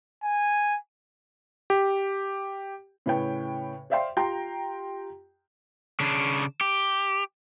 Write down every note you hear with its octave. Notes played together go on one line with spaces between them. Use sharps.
G#5
G4
A2 C#3 B4 C#5 G5
C5 D5 E5 F5 G5 C6
F4 G4 G5 A#5 C6
C#3 D4
G4